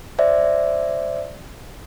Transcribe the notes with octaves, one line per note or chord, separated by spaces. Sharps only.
C5 D5 E5